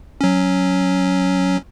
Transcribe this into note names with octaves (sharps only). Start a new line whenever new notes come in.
F#3 C#4